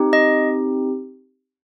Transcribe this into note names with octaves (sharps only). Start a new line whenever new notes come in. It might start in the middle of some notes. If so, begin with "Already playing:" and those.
Already playing: C4 D#4 G4
D#5